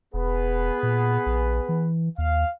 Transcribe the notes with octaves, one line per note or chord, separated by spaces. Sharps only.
E1 B3 G#4 B4
A#2
A#1
E3
D#2 F5